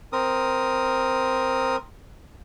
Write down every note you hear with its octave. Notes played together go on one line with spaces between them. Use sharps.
C4 A#4 D#6